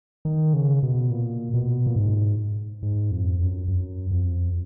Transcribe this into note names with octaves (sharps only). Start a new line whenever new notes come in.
D#3
C#3
B2
A#2
B2
A#2
G#2
G#2
F2
F#2
F#2
F2